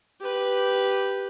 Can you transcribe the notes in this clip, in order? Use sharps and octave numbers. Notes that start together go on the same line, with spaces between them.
G4 B4